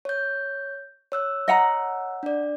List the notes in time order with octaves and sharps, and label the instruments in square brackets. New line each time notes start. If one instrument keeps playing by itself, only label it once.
[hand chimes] C#5 G6
C#5 E6 F#6
[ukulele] D#5 F#5 A#5
[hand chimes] D4 D5